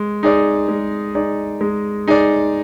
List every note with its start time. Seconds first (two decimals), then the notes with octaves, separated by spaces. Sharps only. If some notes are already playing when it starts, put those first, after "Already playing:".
Already playing: G#3
0.23 D#4 G#4 D5
0.68 G#3
1.15 D#4 G#4 D5
1.61 G#3
2.08 D#4 G#4 D5